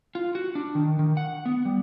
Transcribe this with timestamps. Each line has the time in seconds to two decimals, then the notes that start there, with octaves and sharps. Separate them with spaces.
0.15 F4
0.35 F#4
0.55 D4
0.75 D#3
0.99 D#3
1.17 F#5
1.46 B3
1.65 G3